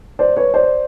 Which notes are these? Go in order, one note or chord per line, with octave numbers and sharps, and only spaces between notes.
C5 D5
B4 C#5
C5 D5